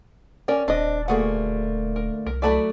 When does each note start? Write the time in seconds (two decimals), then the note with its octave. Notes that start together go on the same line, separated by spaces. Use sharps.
0.48 C#4 A#4 D5 G5
0.68 D#1 C4 D4 D#5
1.08 D2 A3 A#3 F#4 G#4 F#5
1.96 A#4
2.27 C2 A#4
2.42 F#3 A3 E4 D5 A5 B5